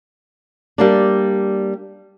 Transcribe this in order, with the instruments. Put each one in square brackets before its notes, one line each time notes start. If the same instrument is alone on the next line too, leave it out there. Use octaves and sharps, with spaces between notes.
[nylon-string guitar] G3 A#3 D4